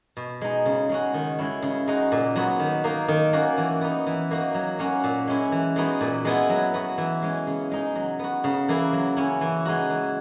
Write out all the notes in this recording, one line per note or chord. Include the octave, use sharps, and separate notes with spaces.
B2
G#3 D#4
C#3
G#3 C#4 F#4
D#3
G#3 C#4 E4
C#3
G#3 D#4 F#4
A#2
F#3 B3 F#4
D#3
A#3 D#4
D#3
A#3 C#4 F#4
E3
B3 D#4
E3
A#3 D#4 F#4
F#3
A#3 C#4 F#4
A#2
G#3 C#4 E4
E3
G#3 B3 D#4 F#4
A#2
G#3 B3 E4
F#3
B3 F#4
E3
G#3 C#4
C#3
G#3 D#4
F#3
B3 F#4
C#3
E3 A#3 E4
F#3
C#4 E4
E3
G#3 D#4 F#4
E3